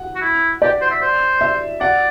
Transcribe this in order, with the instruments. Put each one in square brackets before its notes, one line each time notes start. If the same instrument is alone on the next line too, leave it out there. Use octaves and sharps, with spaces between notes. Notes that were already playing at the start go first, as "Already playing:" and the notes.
Already playing: [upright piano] F#5
[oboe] F#4
E4
[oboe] G4 [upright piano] D5
[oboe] C5
E5
C5
[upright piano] E5
[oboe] D5 [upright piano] F#5